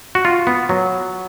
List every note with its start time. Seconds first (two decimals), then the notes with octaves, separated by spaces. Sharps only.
0.15 F#4
0.25 F4
0.47 B3
0.69 F#3